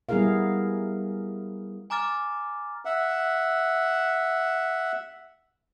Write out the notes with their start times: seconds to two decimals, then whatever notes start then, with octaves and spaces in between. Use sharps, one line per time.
0.09 G3 B3 E4 G#4 A#4 F5
1.90 G#5 A#5 D6 F6 A6
2.85 E5 F#5